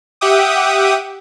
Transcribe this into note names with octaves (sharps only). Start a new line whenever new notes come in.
G4 E5 F#5 G5 D6 D#6